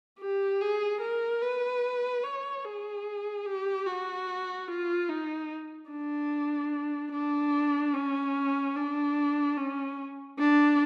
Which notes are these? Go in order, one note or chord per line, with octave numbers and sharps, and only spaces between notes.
G4
G#4
A#4
B4
C#5
G#4
G4
F#4
F4
D#4
D4
D4
C#4
D4
C#4
D4